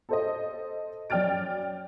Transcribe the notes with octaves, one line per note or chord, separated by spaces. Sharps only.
A4 C5 D#5
F#2 D5 G5 F6 A6 D7